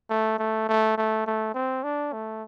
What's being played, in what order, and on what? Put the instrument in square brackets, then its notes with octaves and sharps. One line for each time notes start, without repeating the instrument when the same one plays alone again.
[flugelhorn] A3
A3
A3
A3
A3
C4
D4
A3